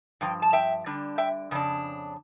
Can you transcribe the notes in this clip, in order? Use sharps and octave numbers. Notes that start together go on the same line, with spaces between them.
G2 F3 G5
A5
E5 G5
D3 G3 D4
E5 G5
F2 C#3 D4